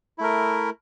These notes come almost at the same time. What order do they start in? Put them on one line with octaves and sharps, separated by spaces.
E4 A3 A#4